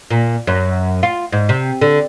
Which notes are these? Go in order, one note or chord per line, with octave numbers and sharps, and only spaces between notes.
A#2
F#2
F4
G#2
C3
D3